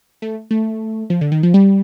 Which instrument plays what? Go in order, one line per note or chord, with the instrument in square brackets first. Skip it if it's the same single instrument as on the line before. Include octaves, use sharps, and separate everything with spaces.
[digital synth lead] A3
A3
F3
D3
D#3
F3
G3